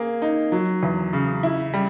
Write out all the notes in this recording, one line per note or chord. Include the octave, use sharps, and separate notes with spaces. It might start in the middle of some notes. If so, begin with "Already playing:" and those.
Already playing: A#3 G#4
D#4
F#3
E2
C#3
E4
G3